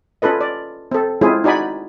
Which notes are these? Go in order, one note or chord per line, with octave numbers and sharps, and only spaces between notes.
C#4 F4 A4 B4 D#5
D5
C4 A4
G#3 C4 C#4 E4 F4 G#4
D#4 F#4 D5 G#5 B5